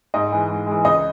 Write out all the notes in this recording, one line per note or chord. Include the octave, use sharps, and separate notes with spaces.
G#2 D#5
E3 G#3
G#2
E3 G#3
C#2 D#5